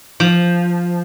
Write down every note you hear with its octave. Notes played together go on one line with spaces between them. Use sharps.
F3